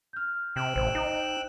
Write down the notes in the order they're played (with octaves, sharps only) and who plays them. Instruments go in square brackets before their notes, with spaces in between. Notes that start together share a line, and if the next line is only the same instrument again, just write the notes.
[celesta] F6 G6
[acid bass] C3 [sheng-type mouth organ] G5 E6 F#6
[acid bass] A1 [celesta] C5
[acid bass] D#4